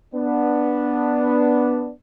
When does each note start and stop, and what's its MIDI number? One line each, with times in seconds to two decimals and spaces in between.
0.14 1.90 59
0.14 1.90 62